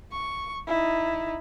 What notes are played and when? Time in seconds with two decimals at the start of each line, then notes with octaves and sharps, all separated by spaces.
0.12 C#6
0.67 D#4 E4